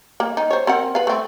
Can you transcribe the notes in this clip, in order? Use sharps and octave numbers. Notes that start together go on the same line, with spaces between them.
A#3
D#4
C5 C#5
C4 A#4 F#5
B4 F5
A3 C4